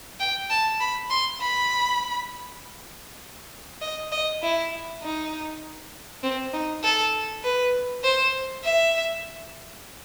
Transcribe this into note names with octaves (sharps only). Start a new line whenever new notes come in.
G5
A5
B5
C6
B5
D#5
D#5
E4
D#4
C4
D#4
A4
B4
C5
E5